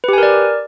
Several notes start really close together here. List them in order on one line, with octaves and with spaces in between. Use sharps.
B4 G4 G#5 A#4 D5